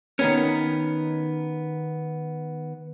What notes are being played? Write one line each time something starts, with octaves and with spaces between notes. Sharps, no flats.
D#3 B3 C#4